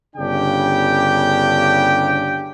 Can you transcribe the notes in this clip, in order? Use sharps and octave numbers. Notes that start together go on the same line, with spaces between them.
G1 C#3 D4 G4 G5